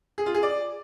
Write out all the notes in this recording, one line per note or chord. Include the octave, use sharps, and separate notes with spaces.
G#4
F4
G#4
D5